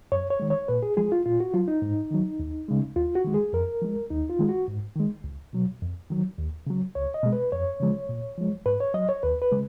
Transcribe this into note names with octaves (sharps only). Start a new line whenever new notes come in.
F#2 C#5
C#5
D#3 G#3
C#5
A#2 B4
G#4
F3 G#3 G#4
F4
A#2 F4
F#4
F#3 F4
D#4
G#2
D#3 F#3
D#2
C#3 G#3
D#2 F4
F#4
D#3 G#3
G#4
F2 A#4
F3 G#3
D#2 D#4
F4
D#3 G#3
F#4
G#2
D#3 G#3
C#2
B2 F#3
F2
D#3 F#3
D#2
C#3 F#3
C#2 C#5
D#5
B2 G#3
B4
F2 C#5
C#3 F3 G#3
A#2
F3 G#3
G#2 B4
C#5
F#3 D#5
C#5
D#2 B4
B4
C#3 G#3